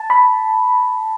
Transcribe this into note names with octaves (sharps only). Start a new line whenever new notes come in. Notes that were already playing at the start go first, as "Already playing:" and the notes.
Already playing: A5
B5